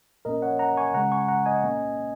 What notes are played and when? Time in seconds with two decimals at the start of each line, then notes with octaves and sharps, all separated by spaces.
0.25 A#2 A#3 C#4 A#4 D#5
0.42 C#5 F#5
0.59 F#5 A#5
0.77 G#5 C#6
0.94 C#3 G#3 C#4 F#5 A#5
1.11 G#5 C#6
1.28 F#5 A#5
1.46 D#5 G#5
1.63 A#2 A#3 C#4